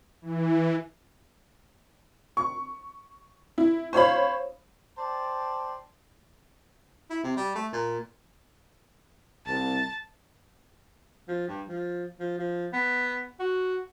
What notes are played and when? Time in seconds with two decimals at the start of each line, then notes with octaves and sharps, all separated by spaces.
0.22 E3
2.37 C#6
3.58 E4
3.93 C5 C#5 F5 B5
4.98 C5 D5 G5 A5
7.10 E4
7.24 C3
7.37 G3
7.55 A3
7.73 A#2
9.46 C2 A5
11.28 F3
11.48 G2
11.68 F3
12.20 F3
12.38 F3
12.73 B3
13.39 F#4